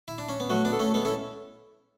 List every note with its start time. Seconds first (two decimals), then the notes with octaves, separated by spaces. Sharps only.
0.08 E4
0.18 D4
0.29 C#4
0.40 B3
0.50 F#3 A3 F#4
0.65 B3 D4
0.72 A4
0.79 A3 C#4
0.94 G#3 B3 A4
1.05 C#4 E4 A4